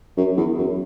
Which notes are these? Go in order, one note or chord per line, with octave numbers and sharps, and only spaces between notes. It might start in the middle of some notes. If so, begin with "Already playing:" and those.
F#2
E2
F#2